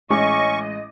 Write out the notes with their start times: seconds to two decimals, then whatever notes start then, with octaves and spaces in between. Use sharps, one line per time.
0.10 A1 G#3 C#4 D#5 C#6 D6